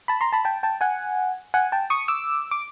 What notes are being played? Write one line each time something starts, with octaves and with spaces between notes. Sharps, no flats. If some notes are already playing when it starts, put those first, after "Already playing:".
A5 B5
A#5 C6
A5 B5
G5 A5
G5 A5
F#5 G#5
F#5 G#5
G5 A5
C#6 D#6
D6 E6
D6